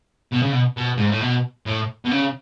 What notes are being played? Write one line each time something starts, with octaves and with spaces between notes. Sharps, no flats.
B2
C#3
B2
B2
G#2
A2
B2
A2
B2
C#3